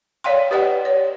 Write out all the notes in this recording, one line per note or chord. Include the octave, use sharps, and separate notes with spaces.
C#5 D5 F5 G5 C6
G4 B4 D5 D#5 F#5 G5
C#5